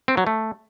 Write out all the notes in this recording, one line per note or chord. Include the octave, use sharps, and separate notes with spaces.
C4
F#3
A3